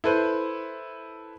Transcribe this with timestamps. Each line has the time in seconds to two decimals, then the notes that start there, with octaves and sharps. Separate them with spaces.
0.04 E4 A4 B4 C5